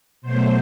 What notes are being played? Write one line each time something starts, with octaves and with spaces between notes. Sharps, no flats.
B2 F#3 A3 C5